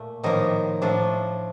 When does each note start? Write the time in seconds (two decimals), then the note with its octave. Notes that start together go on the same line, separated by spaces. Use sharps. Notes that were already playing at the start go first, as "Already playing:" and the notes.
Already playing: A#2 A3
0.23 A2 D#3 F3 A#3 D#4
0.82 A2 F3 A3 D4